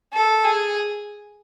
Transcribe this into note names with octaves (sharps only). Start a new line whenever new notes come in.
A4
G#4